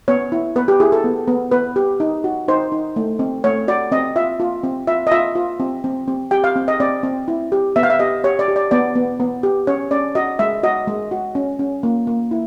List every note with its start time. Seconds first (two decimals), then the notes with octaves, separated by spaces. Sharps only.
0.08 B3 C#5
0.32 E4
0.56 B3 B4
0.68 G4
0.80 E4 G#4
0.92 A4
1.04 B3
1.27 B3
1.51 B3 B4
1.76 G4
2.00 D#4
2.24 F#4
2.48 D#4 C5
2.72 D#4
2.96 A3
3.19 C4
3.44 A3 C#5
3.68 F#4 D5
3.92 C4 D#5
4.16 F4 E5
4.40 F4
4.63 C4
4.87 F4 E5
5.07 D#5
5.11 F4 E5
5.35 F4
5.60 C4
5.84 C4
6.08 C4
6.31 G4 G5
6.44 F5
6.56 C4
6.68 D#5
6.80 C4 D5
7.03 C4
7.28 E4
7.52 G4
7.76 B3 E5
7.83 F5
7.90 E5
7.99 G4 D#5
8.24 G4 C#5
8.39 D5
8.48 G4
8.56 D5
8.71 B3 D5
8.95 B3
9.20 B3
9.43 G4
9.67 C#4 C#5
9.91 C#4 D5
10.15 F#4 D#5
10.39 G#3 E5
10.63 F#4 D#5
10.88 G#3
11.11 F#4
11.35 C#4
11.59 C#4
11.83 A#3
12.07 A#3
12.31 E4